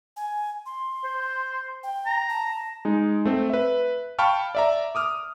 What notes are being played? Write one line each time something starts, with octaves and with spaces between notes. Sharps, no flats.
G#5
C6
C5
G5
A#5
A5
G#3 D#4
A3 C4
B4 E5
F5 G5 A5 B5 C#6 F6
D5 E5 A#5
D6 D#6 F6